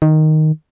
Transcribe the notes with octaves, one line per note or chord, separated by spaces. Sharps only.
D#3